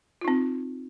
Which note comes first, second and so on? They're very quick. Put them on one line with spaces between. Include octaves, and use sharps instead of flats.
F4 D#4 C4